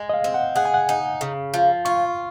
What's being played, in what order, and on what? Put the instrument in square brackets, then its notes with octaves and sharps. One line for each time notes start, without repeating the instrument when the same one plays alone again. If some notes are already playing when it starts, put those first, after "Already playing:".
Already playing: [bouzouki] G#3
[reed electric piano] D#5
F5
[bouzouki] C4
[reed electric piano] F#5
[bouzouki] G#4 [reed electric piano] F#5
[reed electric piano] G#5
F#5
[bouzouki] D#4
C#3
F3
[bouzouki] F4 [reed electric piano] C#6